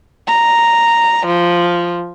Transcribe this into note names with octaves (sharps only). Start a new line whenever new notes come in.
A#5
F3